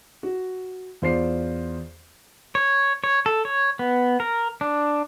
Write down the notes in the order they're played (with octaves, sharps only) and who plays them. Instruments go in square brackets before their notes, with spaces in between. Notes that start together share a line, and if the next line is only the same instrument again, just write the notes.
[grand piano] F#4
E2 F4 C5 D5 C7
[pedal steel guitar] C#5
C#5
A4
C#5
B3
A#4
D4